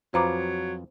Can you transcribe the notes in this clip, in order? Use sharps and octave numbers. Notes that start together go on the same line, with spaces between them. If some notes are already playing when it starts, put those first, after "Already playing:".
F2 F#3 F4 B4 C5 A#5 D6